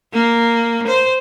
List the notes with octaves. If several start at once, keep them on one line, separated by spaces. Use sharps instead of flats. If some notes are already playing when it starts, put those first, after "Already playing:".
A#3
C5